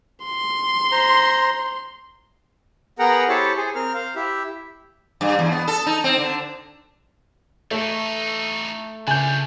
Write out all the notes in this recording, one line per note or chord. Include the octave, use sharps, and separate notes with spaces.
C6
C5 A#5
B3 G#4 A#4 F#5 G5 A#5
E4 G4 A4 C5 C#5 A5
G#4 C5
C4 A#4 F6
C5 F5
E4 G4 E5
G2
E2
B3
A4
D#4
C4
D3
E3 A3 D#4
C#3 D4 F5 G#5 G6